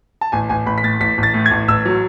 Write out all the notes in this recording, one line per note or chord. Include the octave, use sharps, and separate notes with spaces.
A5
A1 G#5
A1 G#5
A1 B5
B6
A2 A6
A1 B6
A1 A6
A2
G#6
A1
A1 E6
F#3